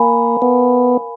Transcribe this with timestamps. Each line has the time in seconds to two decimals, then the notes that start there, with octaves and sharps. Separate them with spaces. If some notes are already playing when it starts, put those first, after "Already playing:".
Already playing: A#3 A#4 F5 G#5 B5
0.42 B3